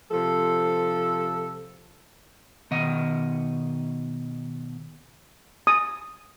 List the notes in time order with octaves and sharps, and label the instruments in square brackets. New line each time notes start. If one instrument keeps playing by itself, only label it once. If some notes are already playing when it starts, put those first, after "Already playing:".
[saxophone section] C3 F3 A4
[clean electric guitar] B2 D#3 D#5 F#5
[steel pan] D#6